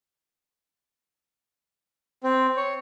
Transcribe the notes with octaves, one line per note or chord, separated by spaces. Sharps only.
C4
C#5